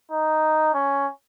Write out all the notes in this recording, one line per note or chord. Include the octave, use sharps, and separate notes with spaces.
D#4
C#4